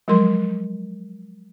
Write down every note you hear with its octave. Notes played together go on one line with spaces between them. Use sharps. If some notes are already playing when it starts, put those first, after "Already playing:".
F3 F#3 G#3 A#4 C6